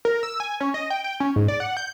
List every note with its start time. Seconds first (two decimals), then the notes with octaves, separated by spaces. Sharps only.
0.05 A#4
0.23 E6
0.40 G#5
0.60 C#4
0.74 D#5
0.90 G5
1.04 G5
1.20 C#4
1.36 G#2
1.48 D5
1.60 F#5
1.77 G6